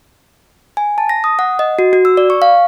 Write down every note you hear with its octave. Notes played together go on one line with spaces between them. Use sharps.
G#5
A5
A#6
D#6
F#5
D#5
F#4
F#4
E6
D5
C#6
F5